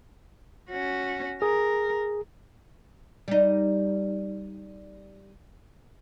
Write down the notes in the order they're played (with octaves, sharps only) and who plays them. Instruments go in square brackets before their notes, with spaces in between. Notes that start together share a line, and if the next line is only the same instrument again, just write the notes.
[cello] C#4 F#4
[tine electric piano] G#4 [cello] A#4
[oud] G3 D#4